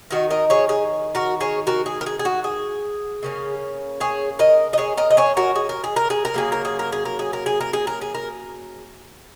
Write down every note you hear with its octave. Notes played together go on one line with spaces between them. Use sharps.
D#3 G#3 D#4 F#4 A#4
A#4 D#5
G#4 C#5
G#4
F#4 A#4
G#4 C#5
F#4 A#4
G#4
A#4
G#4
G#4
F#4
G#4
C#3 A#3 C#4
G#4 C#5
A#4 D#5
D#5
G#4 C#5
A#4 D#5
D#5
G#4 C#5
F#4 A#4
G#4
A#4
G#4
A#4
G#4
A#4
C#3 F#3 A#3 G#4
A#4
G#4
A#4
G#4
A#4
G#4
A#4
G#4
A#4
G#4
A#4
G#4
A#4